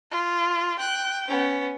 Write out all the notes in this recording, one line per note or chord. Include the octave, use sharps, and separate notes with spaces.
F4
G5 F#6
B3 C#4